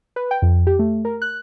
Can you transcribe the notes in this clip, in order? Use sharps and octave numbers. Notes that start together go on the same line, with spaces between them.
B4
G5
F2
G4
A3
A#4
F#6